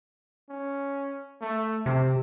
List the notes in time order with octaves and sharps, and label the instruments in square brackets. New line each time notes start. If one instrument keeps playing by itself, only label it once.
[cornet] C#4
A3
[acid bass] C3 [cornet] C4